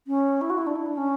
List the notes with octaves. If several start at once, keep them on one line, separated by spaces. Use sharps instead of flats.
C#4
E4
F#4
E4
D4
E4
D4
C#4